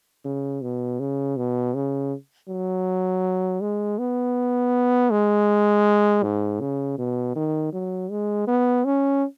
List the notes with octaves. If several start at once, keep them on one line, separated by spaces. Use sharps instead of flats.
C#3
B2
C#3
B2
C#3
F#3
G#3
B3
G#3
G#2
C#3
B2
D#3
F#3
G#3
B3
C#4